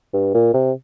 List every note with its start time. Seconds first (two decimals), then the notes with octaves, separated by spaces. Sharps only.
0.13 G2
0.34 A#2
0.54 C3